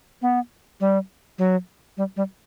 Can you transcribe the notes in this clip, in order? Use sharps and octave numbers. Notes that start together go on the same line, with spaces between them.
B3
G3
F#3
G3
G3